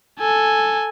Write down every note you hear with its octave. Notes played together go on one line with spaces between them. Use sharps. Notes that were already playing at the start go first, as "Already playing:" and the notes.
A4 G#5